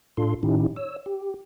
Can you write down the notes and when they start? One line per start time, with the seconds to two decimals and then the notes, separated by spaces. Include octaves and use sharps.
0.17 A2 D4 F4 A4 C6
0.43 A2 D#3 C#4 D#4 E4 G4
0.76 C#5 E6
1.06 G4